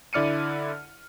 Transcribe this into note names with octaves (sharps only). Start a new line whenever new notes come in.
D3 E4 D5 F6 C#7 D#7